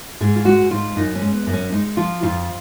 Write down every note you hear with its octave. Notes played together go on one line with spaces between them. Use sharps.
G#2 G#4
F4
G#3 F#4
G#2 F4
F#2 D#4
C#4
G#3
B3
F#2
C#4
G#3 D#4
F3 F4
F2 F4